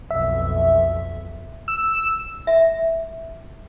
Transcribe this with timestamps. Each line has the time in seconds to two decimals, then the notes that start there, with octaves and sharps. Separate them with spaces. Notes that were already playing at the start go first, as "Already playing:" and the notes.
0.11 B1 F2 E5
1.68 E6
2.47 E5